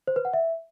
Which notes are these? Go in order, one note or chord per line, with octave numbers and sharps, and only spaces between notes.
C5
B4
F#5
E5